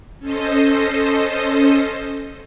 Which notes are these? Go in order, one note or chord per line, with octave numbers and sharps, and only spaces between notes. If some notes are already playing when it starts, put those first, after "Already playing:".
C#4 A4 C5 D#5